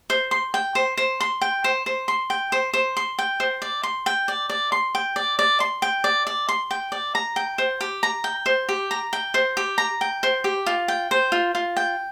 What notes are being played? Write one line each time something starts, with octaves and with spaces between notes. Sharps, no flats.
C5
C6
G5
C5
C5
C6
G5
C5
C5
C6
G5
C5
C5
C6
G5
C5
D5
C6
G5
D5
D5
C6
G5
D5
D5
C6
G5
D5
D5
C6
G5
D5
A#5
G5
C5
G4
A#5
G5
C5
G4
A#5
G5
C5
G4
A#5
G5
C5
G4
F4
G5
C5
F4
F4
G5